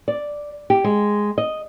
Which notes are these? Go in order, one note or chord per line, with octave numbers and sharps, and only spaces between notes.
D5
G4
G#3
D#5